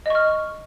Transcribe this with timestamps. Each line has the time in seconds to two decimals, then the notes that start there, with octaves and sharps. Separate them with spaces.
0.06 D#5
0.10 C#6
0.15 F6